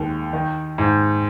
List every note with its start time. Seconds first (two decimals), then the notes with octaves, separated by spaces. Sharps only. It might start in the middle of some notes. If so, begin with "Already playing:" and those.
Already playing: D#2 G#3
0.33 D#3
0.78 G#2